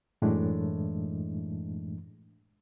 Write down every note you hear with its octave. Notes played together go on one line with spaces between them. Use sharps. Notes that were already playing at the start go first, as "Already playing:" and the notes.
F#2 A2 E3 G#3 A3 D4